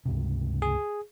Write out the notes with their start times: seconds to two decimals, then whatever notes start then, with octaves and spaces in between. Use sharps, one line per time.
0.05 C#2 G2 C3
0.62 G#4